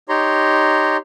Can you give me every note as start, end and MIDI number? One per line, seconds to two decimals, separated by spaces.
0.09 0.97 63
0.09 0.97 67
0.09 0.97 73
0.09 0.97 82
0.09 0.97 84